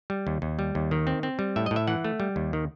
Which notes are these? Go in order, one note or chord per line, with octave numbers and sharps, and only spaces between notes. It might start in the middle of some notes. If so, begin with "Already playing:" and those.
G3
D#2
D#2
G3
D#2
D#3
C4
C4
G3
A2 E5
A2 D#5
E5
E3 F#5
A3
G3
D#2
D#3